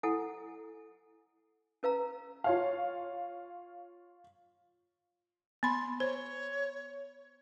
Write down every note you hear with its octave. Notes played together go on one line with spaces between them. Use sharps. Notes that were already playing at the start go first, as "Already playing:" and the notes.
E4 A4 F#5 G#5
C#4 B4 F5 A#5
F4 C#5 F5
B3 B5 C6
C5 C#5